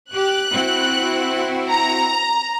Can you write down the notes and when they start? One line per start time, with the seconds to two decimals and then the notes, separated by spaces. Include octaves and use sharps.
0.11 G4 F#6
0.51 C4 E4 F#4
1.71 A#5